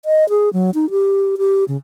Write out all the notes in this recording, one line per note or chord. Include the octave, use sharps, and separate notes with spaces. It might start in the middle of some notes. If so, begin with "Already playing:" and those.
D#5
G#4
F#3
D#4
G4
G4
C#3